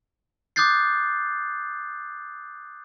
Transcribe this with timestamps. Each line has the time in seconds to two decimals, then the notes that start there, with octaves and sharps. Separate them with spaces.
0.56 D6 D#6 F#6 G6 A6 C7